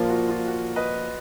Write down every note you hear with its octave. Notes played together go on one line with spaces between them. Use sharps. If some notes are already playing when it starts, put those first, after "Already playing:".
Already playing: A#2 F3 A#3 F4
F#4
F4
F#4
B4 D#5